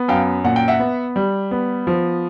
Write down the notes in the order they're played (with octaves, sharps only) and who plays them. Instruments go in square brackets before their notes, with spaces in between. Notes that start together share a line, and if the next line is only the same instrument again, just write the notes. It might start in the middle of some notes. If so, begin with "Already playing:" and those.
Already playing: [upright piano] B3
[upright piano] F#2 [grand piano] F5 G5
[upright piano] A#2 [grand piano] F#5
[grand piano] G5
E5 F#5
[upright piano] B3
G3
B3
F3